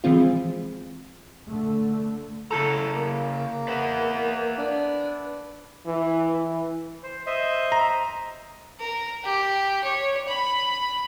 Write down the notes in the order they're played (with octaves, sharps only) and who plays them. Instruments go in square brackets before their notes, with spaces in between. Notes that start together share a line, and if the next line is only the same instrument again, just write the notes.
[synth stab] E3 F3 G#3 C4 F4
[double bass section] D3 A3
[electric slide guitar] C#3 E4 A#5 [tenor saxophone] A4
[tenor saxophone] A#3
[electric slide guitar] B4 E5 F#5
[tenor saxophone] D4
[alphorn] E3
E3
[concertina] C5
C5 D#5 E5
[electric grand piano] A#5
[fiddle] A#4
G4
C#5
B5